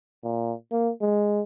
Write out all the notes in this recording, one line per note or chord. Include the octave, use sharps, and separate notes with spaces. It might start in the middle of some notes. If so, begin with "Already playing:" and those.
A#2
A#3
G#3